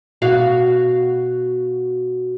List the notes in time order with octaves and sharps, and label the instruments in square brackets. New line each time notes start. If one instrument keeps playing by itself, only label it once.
[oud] B2 F#4 F5